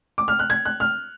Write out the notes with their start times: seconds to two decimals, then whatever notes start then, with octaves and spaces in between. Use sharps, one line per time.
0.18 D6
0.28 F6
0.39 F#6
0.50 G#6
0.65 F#6
0.80 F6